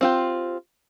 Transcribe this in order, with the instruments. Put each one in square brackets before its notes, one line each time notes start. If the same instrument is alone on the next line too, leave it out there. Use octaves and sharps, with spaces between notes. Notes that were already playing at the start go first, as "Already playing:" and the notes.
[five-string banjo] C4 F4 G4